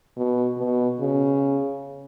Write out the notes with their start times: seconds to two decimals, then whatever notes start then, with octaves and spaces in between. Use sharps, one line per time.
0.17 B2
0.58 B2
1.00 C#3